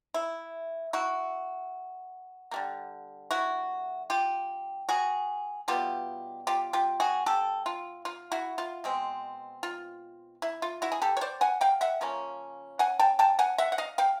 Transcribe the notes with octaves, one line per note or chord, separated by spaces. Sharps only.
E4
E4 F#4
D3 G3 A#3
E4 F#4
F4 G4
F#4 G#4
B2 G3 B3 F4 G4
F4 G4
F4 G4
F#4 G#4
G4 A4
F4
F4
E4 F#4
F4
B2 G#3 C4
F4
E4
F4
E4 F#4
G#4
G4 A4
C#5
C5 D5
F#5 G#5
F5 G5
E5 F#5
C#3 F3 A#3 C#4
F#5 G#5
G5 A5
G5 A5
F#5 G#5
E5 F#5
F#5
D#5 F5
F5 G5